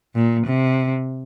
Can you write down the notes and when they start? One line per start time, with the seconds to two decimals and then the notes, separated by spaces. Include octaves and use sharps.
0.15 A#2
0.46 C3